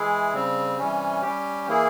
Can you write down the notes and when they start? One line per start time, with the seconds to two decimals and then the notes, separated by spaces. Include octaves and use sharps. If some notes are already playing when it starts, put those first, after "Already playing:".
Already playing: E3 G#3 E4 G#4
0.33 C#3 G3 C4
0.79 C3 E3 G3 C#4
1.22 G3 C#4 G4
1.67 E3 A#3 E4 G#4